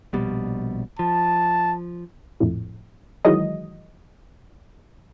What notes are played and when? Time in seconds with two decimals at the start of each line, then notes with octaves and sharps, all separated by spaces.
0.13 A#1 B2 G3
0.99 F3 A5
2.40 A#1 F2 A2
3.25 D#3 E3 F#3 G#3 D#5